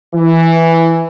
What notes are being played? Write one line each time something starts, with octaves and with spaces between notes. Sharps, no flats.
E3